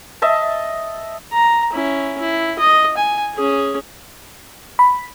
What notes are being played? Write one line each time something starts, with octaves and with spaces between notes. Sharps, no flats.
D#5 E5 A5
A#5
C#4 E4
E4
D#5
G#5
C#4 G#4
B5